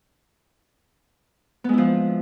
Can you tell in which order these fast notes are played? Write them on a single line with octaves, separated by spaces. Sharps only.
B3 G#3 E4 F3